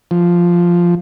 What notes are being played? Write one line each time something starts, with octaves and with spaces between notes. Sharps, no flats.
F3